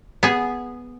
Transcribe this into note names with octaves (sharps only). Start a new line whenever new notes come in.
B3 G#4